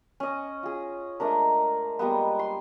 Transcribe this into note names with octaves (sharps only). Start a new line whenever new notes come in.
C#4 D#5
F4 G#4
G#3 A3 D4 A#4
G3 G#3 A#3 B3
C6